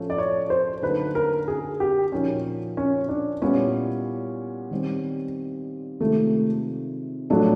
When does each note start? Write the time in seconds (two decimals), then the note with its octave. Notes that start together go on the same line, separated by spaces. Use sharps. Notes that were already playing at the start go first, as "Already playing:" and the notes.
Already playing: A2 F3 A3 C#4
0.10 D5
0.18 C#5
0.50 C5
0.82 D3 F#3 A#3 D#4 B4
1.15 A#4
1.48 G#4
1.80 G4
2.12 A#2 F3 A#3 C#4 D#4 F#4
2.77 C#4
3.09 D4
3.42 A#2 G3 B3 C#4 E4 G4
4.71 D#3 G3 C4
6.00 C3 D#3 G#3 A3 C4 F4
7.30 A2 F3 F#3 A3 D4